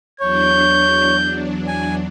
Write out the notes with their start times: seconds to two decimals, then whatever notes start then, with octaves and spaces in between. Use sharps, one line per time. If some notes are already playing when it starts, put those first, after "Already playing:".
0.20 E2 F#3 D4 C#5 G6
1.67 G#5